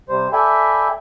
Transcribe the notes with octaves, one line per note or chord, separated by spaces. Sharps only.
C3 G3 C5
A4 D5 E5 G5 G#5 B5